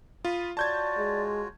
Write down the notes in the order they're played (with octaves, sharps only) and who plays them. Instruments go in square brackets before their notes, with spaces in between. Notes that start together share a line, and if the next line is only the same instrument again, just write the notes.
[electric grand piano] F4 [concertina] B5 D#6
[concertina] F4 F#4 C#5 [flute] D5 [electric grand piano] A5 G6 G#6
[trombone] G#3